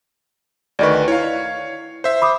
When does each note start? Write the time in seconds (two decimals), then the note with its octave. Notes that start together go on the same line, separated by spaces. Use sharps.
0.79 D2 D#3 B4 D5 D#5 C#6
1.08 E4 C#5 F5
2.04 C5 E5
2.22 B5 D6 D#6